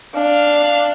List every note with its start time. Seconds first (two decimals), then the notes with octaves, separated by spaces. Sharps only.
0.15 D4 F5